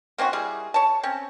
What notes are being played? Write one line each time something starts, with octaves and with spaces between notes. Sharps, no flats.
A#3 C4 C#4 F#4
G3 E4 G#4
C#5 A5
C4 C#4